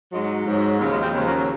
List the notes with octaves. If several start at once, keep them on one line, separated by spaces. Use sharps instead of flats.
G#2 F#3 G#3
G#2 F#3
D#2 C#3 F3 F#3
G#3
G#3 C4
D#2 C#3 F3 G#3
F#3 A#3
F#3